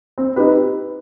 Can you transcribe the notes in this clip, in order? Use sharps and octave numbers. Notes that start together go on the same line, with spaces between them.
C4
D#4 G4 B4